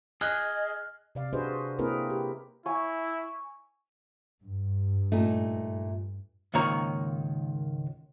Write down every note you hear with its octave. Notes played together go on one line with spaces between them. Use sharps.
G#4 D#5 F6 F#6
C3 D5 F5
D4 F#4 G#4 B4 C5 D#5
A#3 C4 E4 G#4 A#4 B4
G4
E4 C#5 G#5
G2
A#2 A3 D#4
C#2 G#2 D#3 A#3 C#5 A#5